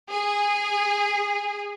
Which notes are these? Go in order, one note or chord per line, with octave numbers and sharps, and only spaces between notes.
G#4